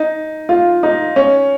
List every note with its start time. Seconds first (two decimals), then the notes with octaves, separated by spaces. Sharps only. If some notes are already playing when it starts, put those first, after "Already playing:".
Already playing: D#4
0.49 F4
0.83 D#4
1.16 C#4